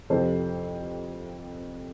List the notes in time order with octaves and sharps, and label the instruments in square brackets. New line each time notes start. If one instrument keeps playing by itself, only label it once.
[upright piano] F2 C3 F3 A4 C5